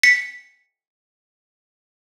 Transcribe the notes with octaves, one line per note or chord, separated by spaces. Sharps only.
B6 C#7